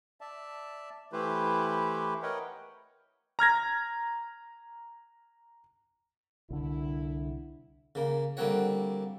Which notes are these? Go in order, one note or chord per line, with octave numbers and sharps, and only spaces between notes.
D5 E5 A5
E3 A3 E4 G4 B4 C5
A#4 B4 C#5 D#5 F#5 G5
A#5 F6 G#6 A#6
C2 D3 E4
C#3 A#3
D3 G3 A#3 C4 F#4 C#5